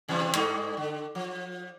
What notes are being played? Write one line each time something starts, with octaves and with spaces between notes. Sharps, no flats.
B2 E3 G3
G2 A3 D#4
D3
F3